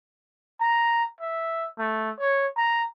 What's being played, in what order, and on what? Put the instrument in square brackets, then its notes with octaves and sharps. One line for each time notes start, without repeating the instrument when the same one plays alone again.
[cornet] A#5
E5
A3
C#5
A#5